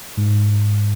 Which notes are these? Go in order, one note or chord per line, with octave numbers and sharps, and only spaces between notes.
G#2